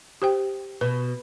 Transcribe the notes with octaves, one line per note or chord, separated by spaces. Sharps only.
G4 C5 G5
B2 B4